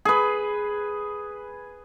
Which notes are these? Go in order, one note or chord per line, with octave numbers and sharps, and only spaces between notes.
G#4 B4